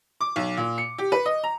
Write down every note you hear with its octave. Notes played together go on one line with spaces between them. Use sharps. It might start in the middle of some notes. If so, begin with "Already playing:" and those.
D6
B1
A#2
C#7
G4
B4
D#5
A#5